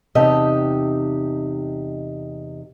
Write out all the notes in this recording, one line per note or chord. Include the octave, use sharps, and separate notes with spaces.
E2 C3 D#4 G4 D#5 A5